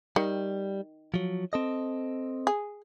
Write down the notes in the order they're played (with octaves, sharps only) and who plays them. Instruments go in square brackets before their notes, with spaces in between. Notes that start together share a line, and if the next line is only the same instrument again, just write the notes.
[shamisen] D#3 [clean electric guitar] G3
[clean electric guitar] F3 F#3
C4 A4 D#5
[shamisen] G#4